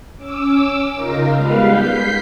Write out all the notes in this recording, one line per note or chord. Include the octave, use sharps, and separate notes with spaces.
C#4 D6 E6
C#3 D#4 F4 A#4
G3 G#3 B3 B4 F5
G6 B6 C7